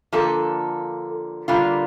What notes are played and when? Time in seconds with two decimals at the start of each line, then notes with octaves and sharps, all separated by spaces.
0.13 D3 F3 A#3 A4
1.48 D3 G3 A#3 F4